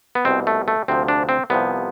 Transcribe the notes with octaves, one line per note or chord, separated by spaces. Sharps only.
B3
C2 B2 C4
A3
A3
D2 C3 F3 C4
D4
C4
C2 C3 F3 B3